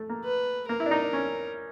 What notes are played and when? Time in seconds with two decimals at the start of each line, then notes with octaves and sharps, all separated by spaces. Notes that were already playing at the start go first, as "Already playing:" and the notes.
Already playing: A3
0.09 A#3
0.24 B4
0.68 A#3 A#4
0.80 E4
0.86 D4
0.91 D#4
1.02 D4
1.13 C#4